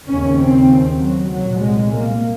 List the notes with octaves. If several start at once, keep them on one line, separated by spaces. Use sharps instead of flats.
D#2 C#3 C#4
C4
F#3
C2 A#2 F#3
G#3
A#3